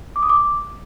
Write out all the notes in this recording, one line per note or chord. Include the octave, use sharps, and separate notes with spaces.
D6
D#6
D6